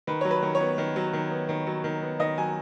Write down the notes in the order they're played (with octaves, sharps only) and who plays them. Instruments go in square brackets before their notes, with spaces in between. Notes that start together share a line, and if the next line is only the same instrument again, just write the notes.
[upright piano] D#3 B4
F#3 C#5
B4
D#3
C#5
B3
D#3
F#3
D#3
B3
D#3
F#3
D#3
B3
D#3 D#5
F#3 G#5